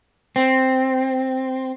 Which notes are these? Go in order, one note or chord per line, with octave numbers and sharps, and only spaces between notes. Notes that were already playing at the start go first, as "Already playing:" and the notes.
C4